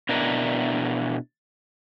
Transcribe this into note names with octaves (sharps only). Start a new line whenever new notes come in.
B2 D4 E4 A#4